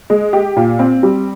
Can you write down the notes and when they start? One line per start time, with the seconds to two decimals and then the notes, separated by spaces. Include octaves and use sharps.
0.10 G#3
0.33 G4
0.56 A#2
0.79 C4
1.03 G3